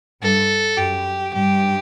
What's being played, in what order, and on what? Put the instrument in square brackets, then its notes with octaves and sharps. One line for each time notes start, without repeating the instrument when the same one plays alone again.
[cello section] G2 [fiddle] A4
[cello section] F#2 [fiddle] G4
[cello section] G2 [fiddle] G4